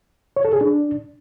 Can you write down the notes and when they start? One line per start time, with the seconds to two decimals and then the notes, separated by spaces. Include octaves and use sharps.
0.36 C#5
0.45 A4
0.53 G#4
0.61 D4